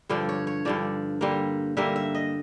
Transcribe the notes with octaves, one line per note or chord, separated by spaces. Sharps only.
G2 D3 F3 D5
C#5
C#5
G2 D3 F3 D5
D3 G3 A#3
D3 G3 A#3 E5
E5
D#5